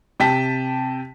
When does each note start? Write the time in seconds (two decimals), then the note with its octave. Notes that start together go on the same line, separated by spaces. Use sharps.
0.20 C3 G5 A5 B6